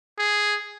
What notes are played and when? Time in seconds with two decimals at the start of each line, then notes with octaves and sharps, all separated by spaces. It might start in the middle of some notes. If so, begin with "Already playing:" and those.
0.18 G#4